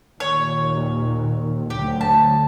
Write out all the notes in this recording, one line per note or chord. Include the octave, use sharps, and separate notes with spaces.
D#2 A#2 C#5
D2 F#3 G4
A5